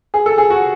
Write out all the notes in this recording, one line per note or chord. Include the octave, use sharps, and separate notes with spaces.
G#4
A4
G#4
F#4